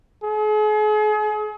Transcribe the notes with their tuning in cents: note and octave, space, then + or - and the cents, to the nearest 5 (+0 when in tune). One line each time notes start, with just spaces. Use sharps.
G#4 +40